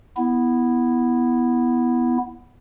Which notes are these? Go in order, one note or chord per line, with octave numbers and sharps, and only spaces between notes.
B3 E4